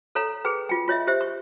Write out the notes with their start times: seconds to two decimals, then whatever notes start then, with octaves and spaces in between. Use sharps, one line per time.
0.15 A4 C#5 F5 A#5
0.45 G#4 B4 G5
0.69 F4 G5
0.88 F4 C#5 D#5 E5
1.07 G4 C5 E5
1.21 C#6